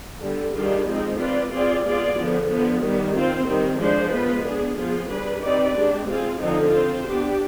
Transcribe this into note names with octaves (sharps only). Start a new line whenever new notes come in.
D3 G3 B3
D#3 G3 D4 F4 G#4
F3 G#3 C4 D#4
C4 F4 B4 D5
C4 F4 G#4 D5
G#3 B3 F4 G#4 D5
D3 F3 B3
D3 F3 B3
D#3 G3 B3
C4 F4 C5
D#3 G3 C4
F3 G#3 D4 G#4 C5
G#3 B3 F4 B4
B3 D4 G#4
F3 B3 F4 G#4
G3 D4 G#4 B4
C4 D#4 G4 B4 D5
G#3 D4 G4
C4 F4 G#4
D3 F3 C4 D#4
C4 F4 C5
B3 D4 G4